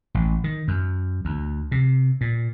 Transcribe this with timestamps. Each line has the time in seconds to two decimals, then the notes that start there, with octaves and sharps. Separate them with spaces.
0.15 A1
0.44 D#3
0.68 F#2
1.25 D2
1.72 C3
2.21 A#2